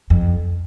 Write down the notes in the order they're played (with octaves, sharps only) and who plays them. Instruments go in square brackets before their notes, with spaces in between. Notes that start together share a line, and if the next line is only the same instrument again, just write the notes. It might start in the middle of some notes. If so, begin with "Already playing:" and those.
[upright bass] F2